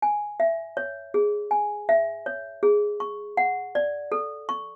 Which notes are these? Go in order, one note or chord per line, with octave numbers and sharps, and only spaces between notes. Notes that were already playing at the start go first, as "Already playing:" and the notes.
G#5
E5
C#5
G#4
G#5
E5
C#5
G#4
C#6
F#5
D5
A4
C#6